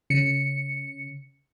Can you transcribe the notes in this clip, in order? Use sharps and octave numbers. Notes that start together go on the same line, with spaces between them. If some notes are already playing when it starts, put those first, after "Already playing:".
C#3 C#7